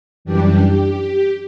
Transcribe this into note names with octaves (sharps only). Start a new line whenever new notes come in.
F#2 E3 G3 D4 G4